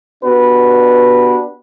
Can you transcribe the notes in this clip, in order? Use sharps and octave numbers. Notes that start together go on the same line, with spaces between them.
B3 D4 F#4 G4 B4